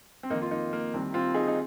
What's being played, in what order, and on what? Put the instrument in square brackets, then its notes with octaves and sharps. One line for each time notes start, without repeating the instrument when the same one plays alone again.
[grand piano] C4
F2 D#3 A#3 D#4
F4
A#3 D#4
A#3
C2 C3 D#3 C4
C4 F4
D#4 G#4
D#4